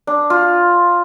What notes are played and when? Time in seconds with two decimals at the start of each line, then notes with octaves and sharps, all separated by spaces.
0.07 D4
0.30 F4